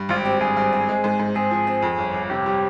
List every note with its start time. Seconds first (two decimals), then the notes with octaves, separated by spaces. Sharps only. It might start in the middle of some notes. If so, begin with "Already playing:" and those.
Already playing: G2
0.09 G#1 F4
0.17 G4
0.25 C4
0.41 G2 G#4
0.57 G2
0.73 C4
0.88 G#3
1.04 G#2
1.20 G#2
1.35 C4 G#4
1.51 F3
1.67 C4
1.82 F2
1.98 G1
2.14 G1
2.30 C3 G4
2.46 G3